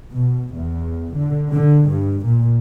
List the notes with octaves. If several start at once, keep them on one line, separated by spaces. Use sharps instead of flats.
B2
E2
D3
D3
G2
A#2